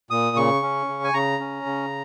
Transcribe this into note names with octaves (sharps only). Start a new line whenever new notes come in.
A#2 D#6
C#3 C#6
C#4
C#3
G#5
C#3 A#5
C#4
C#3